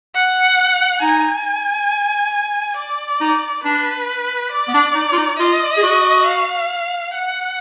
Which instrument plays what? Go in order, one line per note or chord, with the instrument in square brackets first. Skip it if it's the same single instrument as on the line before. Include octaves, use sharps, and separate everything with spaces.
[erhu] F#5
[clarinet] D#4 [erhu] G#5
[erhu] D5
[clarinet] D#4
[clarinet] D4 [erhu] B4
[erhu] D5
[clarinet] B3
D4
D#4
F4
D#4
[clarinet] F4 [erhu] D#5
[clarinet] G#4
F#4
[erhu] F5
F#5